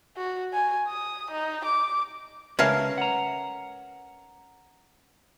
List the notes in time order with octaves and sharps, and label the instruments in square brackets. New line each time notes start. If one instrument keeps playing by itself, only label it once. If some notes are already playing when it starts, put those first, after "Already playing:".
[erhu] F#4
G#5
D#6
D#4
D6
[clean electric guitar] C#2 [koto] C#4 A#4 A5 [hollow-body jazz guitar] B4 E5 F5
[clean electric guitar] F#5 A#5